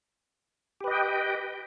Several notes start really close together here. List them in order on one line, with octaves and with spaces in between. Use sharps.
G4 B4 D#5 G5